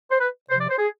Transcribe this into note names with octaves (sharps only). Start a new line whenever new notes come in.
C5
B4
C3 F3 C5
D5
C5
G#4